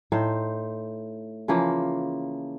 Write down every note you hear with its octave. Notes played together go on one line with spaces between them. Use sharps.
A2 D#4 C5
C#3 E3 F3 A#3